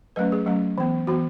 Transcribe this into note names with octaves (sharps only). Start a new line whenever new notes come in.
F#3 A3 C#4 B4
G#4
F#3 A3 C#4
E3 B3
E3 B3 F#4